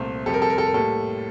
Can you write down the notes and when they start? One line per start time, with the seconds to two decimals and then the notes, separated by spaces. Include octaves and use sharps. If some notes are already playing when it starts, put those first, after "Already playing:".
Already playing: C2 A#2 A3 C4
0.26 F2 C3 G3 A4
0.34 A#4
0.42 A4
0.50 A#4
0.58 A4
0.66 A#4
0.74 A2 G3 A#3 A4